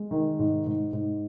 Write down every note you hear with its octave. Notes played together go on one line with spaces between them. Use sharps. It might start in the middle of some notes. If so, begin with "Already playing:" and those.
Already playing: G#3
D#3
G#2
G#2
G#2